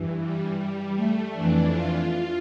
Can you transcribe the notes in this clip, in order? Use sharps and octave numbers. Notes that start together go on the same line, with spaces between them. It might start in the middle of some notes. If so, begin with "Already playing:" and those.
Already playing: G2 E3
G3
G3
A3
F2 E3 D4
F4